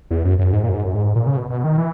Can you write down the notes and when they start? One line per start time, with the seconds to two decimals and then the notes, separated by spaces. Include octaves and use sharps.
0.11 E2
0.25 F#2
0.39 F#2
0.53 G#2
0.63 A#2
0.69 F#2
0.74 G#2
0.85 F#2
0.94 G#2
1.16 A#2
1.27 C#3
1.37 B2
1.50 B2
1.64 D#3
1.78 E3